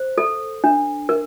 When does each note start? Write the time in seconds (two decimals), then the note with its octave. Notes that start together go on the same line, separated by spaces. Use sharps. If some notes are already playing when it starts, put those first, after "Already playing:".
Already playing: C5
0.18 A4
0.64 D4
1.09 A#4